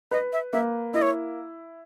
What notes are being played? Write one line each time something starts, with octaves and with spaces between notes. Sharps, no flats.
B4 D#5
E5
A#3 E5
E4 D#5
C#5